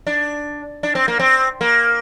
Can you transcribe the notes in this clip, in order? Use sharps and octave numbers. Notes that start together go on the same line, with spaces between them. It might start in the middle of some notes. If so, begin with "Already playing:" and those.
D4
D4
C4
A#3
C4
A#3